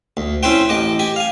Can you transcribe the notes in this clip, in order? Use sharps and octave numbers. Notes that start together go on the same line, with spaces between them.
D2
C#4 E4 B4 C5 G5
A1 D#5 D6
G4 G#5
F5 G#5